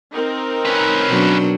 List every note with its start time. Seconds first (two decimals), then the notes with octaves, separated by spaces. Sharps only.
0.13 C4 D#4 A#4
0.65 C#4 B4
1.07 B2 F#3 D4